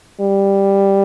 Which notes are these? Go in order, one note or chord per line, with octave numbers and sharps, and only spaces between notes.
G3